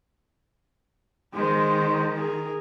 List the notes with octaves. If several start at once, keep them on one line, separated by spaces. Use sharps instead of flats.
D#3 G#3 C5
G#4 A#4